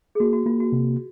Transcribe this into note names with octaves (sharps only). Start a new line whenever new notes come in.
G#4
A#3 F#4
F#4
A#3 F4
F#4
C3